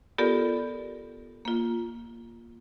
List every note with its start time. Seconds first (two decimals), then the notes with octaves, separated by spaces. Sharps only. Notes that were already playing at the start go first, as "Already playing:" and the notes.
0.18 B3 F4 G4 A4 A#4 D5
1.45 A#3 F4